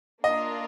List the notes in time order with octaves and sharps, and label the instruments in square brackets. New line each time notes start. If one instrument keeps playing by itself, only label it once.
[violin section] A#3 D4 F4 A#4 [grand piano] D#5